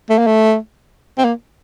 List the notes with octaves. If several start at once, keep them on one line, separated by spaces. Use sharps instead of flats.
A3
A#3
A3
C4
A#3